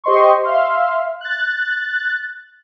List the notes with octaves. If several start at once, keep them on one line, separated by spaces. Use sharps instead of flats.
G4 C5 D#5 C6 C#6
E5 F5 C6
F#6 A6